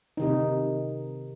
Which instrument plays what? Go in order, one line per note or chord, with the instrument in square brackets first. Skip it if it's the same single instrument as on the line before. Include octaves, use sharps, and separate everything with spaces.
[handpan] C3 D#3 D#4